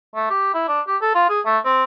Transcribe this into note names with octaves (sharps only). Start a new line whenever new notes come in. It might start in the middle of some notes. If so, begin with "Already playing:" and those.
A3
G4
E4
D4
G4
A4
F4
G#4
A3
C4